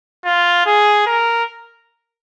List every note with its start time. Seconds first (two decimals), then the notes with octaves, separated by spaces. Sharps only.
0.25 F4
0.66 G#4
1.06 A#4